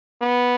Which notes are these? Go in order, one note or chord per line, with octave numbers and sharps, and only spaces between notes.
B3